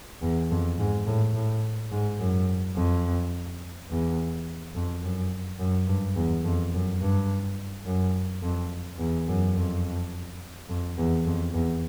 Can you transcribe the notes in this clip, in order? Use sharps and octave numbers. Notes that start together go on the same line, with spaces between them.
E2
F2
G#2
A2
A2
G#2
F#2
F2
E2
F2
F#2
F#2
G2
E2
F2
F#2
G2
F#2
F2
E2
F#2
F2
F2
E2
F2
E2